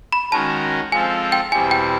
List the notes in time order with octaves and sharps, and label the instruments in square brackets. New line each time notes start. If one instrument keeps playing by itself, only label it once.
[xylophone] B5
[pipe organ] D#3 G#3 C#4 F#4 A#4 [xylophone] A5
[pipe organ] F3 G#3 C4 F4 A4 [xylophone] G#5
[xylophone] G5
[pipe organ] E2 B2 G3 C4 E4 [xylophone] G#5
[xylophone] G5